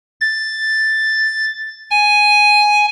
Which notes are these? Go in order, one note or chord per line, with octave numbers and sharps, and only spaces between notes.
A6
G#5